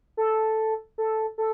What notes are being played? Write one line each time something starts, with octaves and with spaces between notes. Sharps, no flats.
A4
A4
A4